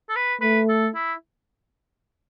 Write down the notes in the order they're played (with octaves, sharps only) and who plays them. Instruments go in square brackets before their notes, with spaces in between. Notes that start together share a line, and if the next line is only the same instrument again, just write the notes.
[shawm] A4
B4
[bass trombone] A3 [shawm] B4
[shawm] A4
E4